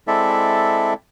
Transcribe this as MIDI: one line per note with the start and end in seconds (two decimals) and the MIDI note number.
0.08 0.93 56
0.08 0.93 60
0.08 0.93 64
0.08 0.93 69
0.08 0.93 74
0.08 0.93 76